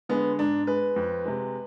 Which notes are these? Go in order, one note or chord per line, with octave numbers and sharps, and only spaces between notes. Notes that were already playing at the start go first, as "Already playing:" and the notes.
D3 G#3 B3
G#2 D4
G#3 B4
F2
C3 G#3